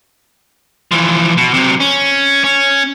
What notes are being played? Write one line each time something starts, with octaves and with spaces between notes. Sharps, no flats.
E3 F3
B2
C3 F#3
C#4
C#4